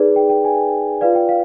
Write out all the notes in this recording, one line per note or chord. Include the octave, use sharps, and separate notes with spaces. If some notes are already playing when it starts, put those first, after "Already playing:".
Already playing: D#4 G#4 B4 D5
G5
G5
G#5
F4 B4 D5 F5
G5
F5